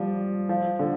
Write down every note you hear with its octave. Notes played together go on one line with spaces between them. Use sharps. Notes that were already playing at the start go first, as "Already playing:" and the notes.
Already playing: F3 G3
F3
D3